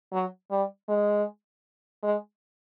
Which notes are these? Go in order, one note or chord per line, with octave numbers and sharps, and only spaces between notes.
F#3
G3
G#3
G#3